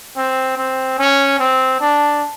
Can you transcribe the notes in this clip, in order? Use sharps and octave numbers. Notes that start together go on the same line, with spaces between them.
C4
C4
C#4
C4
D4